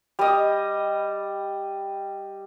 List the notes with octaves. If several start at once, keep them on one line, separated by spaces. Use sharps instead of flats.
G3 D#5